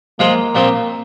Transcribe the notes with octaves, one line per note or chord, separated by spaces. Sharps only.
F3 G#3 A#3 F4 C5
A#2 F3 C4